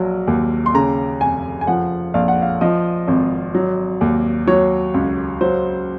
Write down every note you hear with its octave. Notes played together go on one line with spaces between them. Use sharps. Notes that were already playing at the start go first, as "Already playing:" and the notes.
Already playing: A#1 F#3
D#2
C6
C#3 A#5
F1 G#5
G#5
F3 F#5
A#1 F5
F#5
F5
F3 D#5
G#1
F#3
D#2
F#3 C#5
C#2
F#3 C5